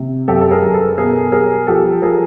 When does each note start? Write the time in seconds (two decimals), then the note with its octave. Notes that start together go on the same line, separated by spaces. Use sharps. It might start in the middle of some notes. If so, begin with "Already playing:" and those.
Already playing: C3
0.28 F#2 G4 A4
0.41 A4
0.51 G#4 A#4
0.63 F#2
0.74 A4 B4
0.97 B2 G#4 A#4
1.32 G3 G#4 A#4
1.67 F3 G4 A4
2.02 F3 G#4 A#4